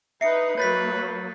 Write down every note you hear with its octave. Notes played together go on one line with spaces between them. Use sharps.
D#4 B4 E5 C7 C#7
F#3 A#3 B4 C#5 G6 A6 B6